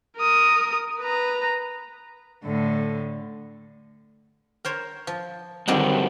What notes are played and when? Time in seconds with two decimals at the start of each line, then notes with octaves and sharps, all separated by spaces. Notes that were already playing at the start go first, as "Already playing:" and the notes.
0.18 A#4 D#6
1.00 B4 A#5
2.44 A2 D3
4.65 A#4 C5 C#5
5.07 F3
5.68 G2 D3 D#3 F#3 G3 C4